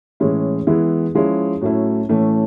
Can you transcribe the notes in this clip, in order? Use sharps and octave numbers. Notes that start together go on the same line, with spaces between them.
A2 E3 G#3 C#4 E4
E3 G#3 B3 E4
F3 G#3 C#4 E4
A2 F#3 A3 C#4 E4
A2 E3 A3 C#4